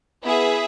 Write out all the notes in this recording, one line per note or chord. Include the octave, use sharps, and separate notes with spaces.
B3 E4 G#4 E5